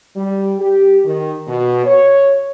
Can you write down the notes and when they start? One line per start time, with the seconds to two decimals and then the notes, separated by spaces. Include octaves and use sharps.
0.16 G3
0.60 G4
1.05 D#3
1.47 B2
1.85 C#5